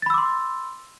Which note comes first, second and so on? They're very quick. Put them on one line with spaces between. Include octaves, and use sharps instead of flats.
A6 B5 E6 D6 C6